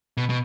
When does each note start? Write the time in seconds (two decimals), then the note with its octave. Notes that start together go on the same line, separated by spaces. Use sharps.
0.17 B2
0.30 B2